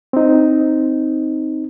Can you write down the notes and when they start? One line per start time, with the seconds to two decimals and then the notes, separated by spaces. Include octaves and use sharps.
0.13 C4 D#4